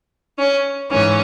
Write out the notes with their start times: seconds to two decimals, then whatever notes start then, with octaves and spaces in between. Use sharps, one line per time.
0.39 C#4
0.90 G#2 E3 C#4